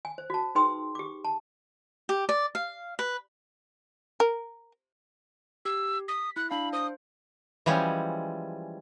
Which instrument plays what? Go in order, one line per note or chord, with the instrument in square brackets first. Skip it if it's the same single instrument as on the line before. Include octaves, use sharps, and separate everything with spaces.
[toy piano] G#5
C5
F#4 A5
D#4 G#4 B4 G5 C6 D#6
G4 D6
A5
[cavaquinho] G4
D5
F5
B4
[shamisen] A#4
[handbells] G4 [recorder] E6
[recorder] D#6 [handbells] B6
[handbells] E4 [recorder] F#6
[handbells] D4 F5 [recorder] B5
[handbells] C5 [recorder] D#6
[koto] E3 F3 G3 G#3 C#4